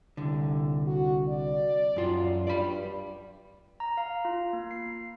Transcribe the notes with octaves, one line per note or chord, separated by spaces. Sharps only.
C2 D3
F#4
D5
F#2 F4
G2 D5 B5
A#5
F5
F4
A#3
C7